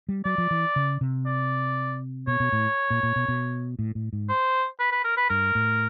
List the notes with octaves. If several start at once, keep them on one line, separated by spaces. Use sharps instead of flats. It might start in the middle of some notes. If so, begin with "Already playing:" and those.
G3
F#3 D5
F3
E3
C#3
C3
D5
B2 C#5
B2
A2
A#2
A#2
B2
B2
A2
A2
G#2
C5
B4
B4
A#4
B4
G2 A#4
A2